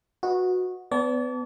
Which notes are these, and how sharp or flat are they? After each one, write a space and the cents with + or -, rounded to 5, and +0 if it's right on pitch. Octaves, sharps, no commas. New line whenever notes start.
F#4 -15 B4 -10 D#5 +0
B3 +30 D5 -40 A5 +0